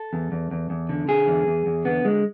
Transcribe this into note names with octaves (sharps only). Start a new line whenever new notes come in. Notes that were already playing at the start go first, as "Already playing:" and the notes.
Already playing: A4
E2
E2
E2
E2
D3
D3 G#4
E2
E2
E2
D3 B3
D3 G#3